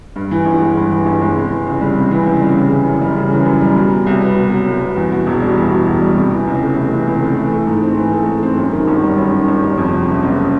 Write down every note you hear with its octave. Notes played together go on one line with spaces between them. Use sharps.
G2
E3
G1
G#3
G2
E3
G1
G#3
C3
E3
C#2
G3
C3
E3
C#2
G3
C#3
E3
F#2
G3
C#3
E3
F#2
G3
B2
F#3
C2
B3
B2
F#3
C2
B3
E2
B2
E1
G3
E2
B2
E1
G3
C3
E3
C#2
A3
C3
E3
C#2
A3
E3
A3
G#2
C4
E3
A3
G#2
C4
F#2
D#3
G1
G3
F#2
D#3
G1
G3
F2
C3
F#1
F#1